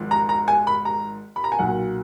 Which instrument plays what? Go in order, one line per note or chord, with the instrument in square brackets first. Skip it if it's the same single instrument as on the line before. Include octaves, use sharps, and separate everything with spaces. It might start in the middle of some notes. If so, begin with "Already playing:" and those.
Already playing: [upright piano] G#1 G#2 F3
A#5
A#5
G#5
B5
A#5
B5
A#5
G#5
B1 A#2 F#3 F#5